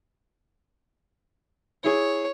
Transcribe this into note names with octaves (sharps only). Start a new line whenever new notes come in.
E4 G#4 C#5